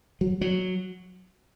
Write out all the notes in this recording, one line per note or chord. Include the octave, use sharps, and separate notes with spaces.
F#3
F#3